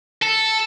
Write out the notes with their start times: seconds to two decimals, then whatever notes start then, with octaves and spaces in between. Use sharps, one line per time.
0.22 A4